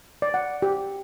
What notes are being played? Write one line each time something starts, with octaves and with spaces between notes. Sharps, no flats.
D5
F#5
G4